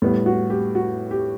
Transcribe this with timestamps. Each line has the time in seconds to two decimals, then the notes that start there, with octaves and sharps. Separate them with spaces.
0.02 A2 G3 B3
0.26 F#4
0.50 G4
0.75 F#4
1.11 G4